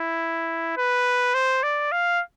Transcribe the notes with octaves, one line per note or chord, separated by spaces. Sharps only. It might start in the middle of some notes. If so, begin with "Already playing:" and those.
Already playing: E4
B4
C5
D5
F5